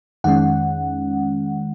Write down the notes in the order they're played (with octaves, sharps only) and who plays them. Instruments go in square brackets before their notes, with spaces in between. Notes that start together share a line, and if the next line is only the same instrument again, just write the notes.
[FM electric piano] F2 D#3 G#3 C#4 F#5